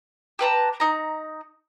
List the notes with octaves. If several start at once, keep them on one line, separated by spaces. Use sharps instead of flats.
G4 B4 A5 A#5
D#4 A#5